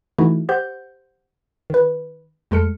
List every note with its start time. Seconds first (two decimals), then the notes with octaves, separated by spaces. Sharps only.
0.18 E3 A3 D#4 E4 F#4
0.49 G4 C5 F#5 G6
1.70 D#3 B4
2.51 F2 G#3 A3 A4 F6 C#7